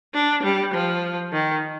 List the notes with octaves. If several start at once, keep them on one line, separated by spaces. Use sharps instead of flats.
D4
G3
F3
D#3